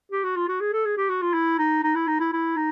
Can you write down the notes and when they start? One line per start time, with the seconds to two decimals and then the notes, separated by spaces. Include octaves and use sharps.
0.12 G4
0.24 F#4
0.36 F4
0.48 F#4
0.61 G#4
0.73 A4
0.85 G#4
0.97 G4
1.10 F#4
1.22 F4
1.34 E4
1.59 D#4
1.83 D#4
1.95 E4
2.07 D#4
2.20 E4
2.32 E4
2.56 D#4